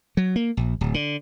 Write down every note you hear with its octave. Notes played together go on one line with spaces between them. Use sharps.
F#3
A#3
A#1
D1
D3